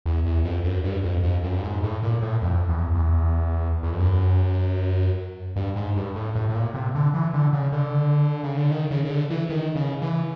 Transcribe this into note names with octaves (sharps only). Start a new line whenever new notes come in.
E2
E2
F2
F#2
G2
F2
F2
F#2
G2
G#2
A2
A#2
A2
F2
E2
E2
E2
F2
F#2
G2
G#2
G2
A2
A2
A2
A#2
C3
D3
E3
D3
C#3
D3
C#3
D3
D#3
C#3
C#3
D3
E3
D#3
C#3
E3